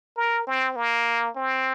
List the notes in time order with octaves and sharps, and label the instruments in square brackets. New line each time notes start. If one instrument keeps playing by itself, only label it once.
[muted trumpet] A#4
C4
A#3
C4